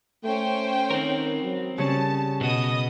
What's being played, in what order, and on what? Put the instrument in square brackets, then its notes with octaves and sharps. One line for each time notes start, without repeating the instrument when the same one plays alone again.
[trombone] A3 [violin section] C#4 C5 G5
[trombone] D#3 [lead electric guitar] C4 A#4
[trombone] F#3
[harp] C#3 C#4 [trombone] G3 [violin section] A5
[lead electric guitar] B2 F#4 [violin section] B3 D#5 D#6